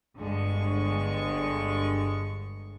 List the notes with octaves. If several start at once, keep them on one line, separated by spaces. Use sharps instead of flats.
G1 G2 D3 G#3 C#6